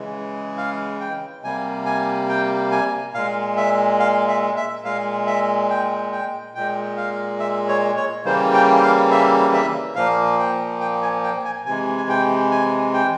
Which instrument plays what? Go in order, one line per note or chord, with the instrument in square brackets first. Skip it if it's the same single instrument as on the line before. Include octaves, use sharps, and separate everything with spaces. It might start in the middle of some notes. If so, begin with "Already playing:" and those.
Already playing: [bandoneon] C#3 E3 G#3
F5
G5
C3 G3 A#3 G#5
G#5
G5
G#5
A#2 G#3 F5
E5
F5
E5
E5
A#2 G#3 F5
E5
G5
G5
A#2 G#3 G5
F5
E5
C#5
C#5
C#3 E3 G3 A#3 C5
G5
F5
E5
E5
A#2 F3 A#3 F5
G5
G5
G#5
G5
G#5
C3 E3 G#3 G#5
G#5
G5
G#5
G5